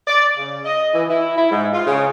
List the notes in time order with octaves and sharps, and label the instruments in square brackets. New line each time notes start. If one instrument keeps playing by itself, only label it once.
[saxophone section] D5
C#3
D#5
E3
E4
E4
G#2
F4
C#3